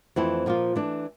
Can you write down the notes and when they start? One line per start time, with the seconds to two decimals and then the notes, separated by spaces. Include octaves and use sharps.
0.16 F2 E3 A3 C4 E4
0.46 A#2 F3 A#3 F4
0.75 E3 A3 D4